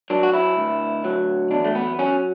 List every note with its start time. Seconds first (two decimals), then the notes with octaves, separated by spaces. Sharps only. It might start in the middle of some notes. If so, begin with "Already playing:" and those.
0.10 F#3 D4
0.23 F#4
0.34 E4
0.57 D2
1.04 F#3
1.51 E2 D4
1.65 A3
1.75 B3
1.99 F#3 C#4